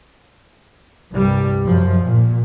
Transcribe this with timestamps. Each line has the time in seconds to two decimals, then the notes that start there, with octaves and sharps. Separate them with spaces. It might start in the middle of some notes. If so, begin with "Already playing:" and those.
1.11 C2 G2 G3
1.67 F#2 F3
2.05 A#2